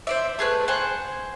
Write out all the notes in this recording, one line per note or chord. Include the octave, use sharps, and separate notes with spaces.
C5 D5 E5
A3 G#4 B4 F#6
C5 F#5 G#5